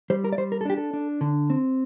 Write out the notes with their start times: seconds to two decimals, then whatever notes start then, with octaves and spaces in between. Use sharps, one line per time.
0.10 G3 C5
0.24 A#4
0.33 D5
0.38 G3 C5
0.52 A#4
0.61 A4
0.65 D4 G4
0.78 A4
0.93 D4
1.21 D3
1.50 C4